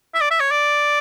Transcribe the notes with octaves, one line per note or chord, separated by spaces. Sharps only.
E5
D5
E5
C#5
D5